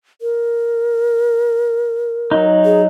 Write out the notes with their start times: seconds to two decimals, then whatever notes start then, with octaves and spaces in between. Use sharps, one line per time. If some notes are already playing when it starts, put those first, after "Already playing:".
0.22 A#4
2.31 F#3 D#4
2.65 G#4